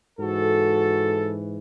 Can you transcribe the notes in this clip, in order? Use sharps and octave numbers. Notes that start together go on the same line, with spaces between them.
G#2 E3 F#4 A4